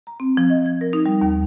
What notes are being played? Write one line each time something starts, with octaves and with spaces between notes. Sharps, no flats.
A#5
C4
F3
D#5
G#6
A#4
D#4
G3
D#2